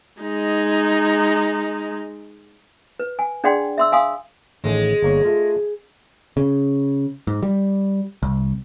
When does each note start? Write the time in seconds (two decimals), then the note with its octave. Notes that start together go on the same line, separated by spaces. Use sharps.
0.21 G#3 D#4
3.00 B4
3.19 G#5
3.44 D4 G#4 D5 F#5 G5 C6
3.78 E5 C6 E6
3.92 F5 G#5 C6 D#6
4.64 A1 A2 D#3 G#3
5.02 G1 A#3 C#5
5.25 A3 F4
6.37 C#3
7.27 G#2
7.43 G3
8.23 C2